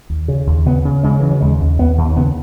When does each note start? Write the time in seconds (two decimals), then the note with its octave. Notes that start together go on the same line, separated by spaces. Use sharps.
0.10 D#2
0.28 C#3
0.47 D#2
0.65 C#3 B3
0.85 C#3
1.03 C#3 G#3
1.20 C#3 E3
1.31 F#3
1.41 D#2 G#3
1.60 D#2
1.79 D#2 B3
1.98 D#2
2.17 C#3 B3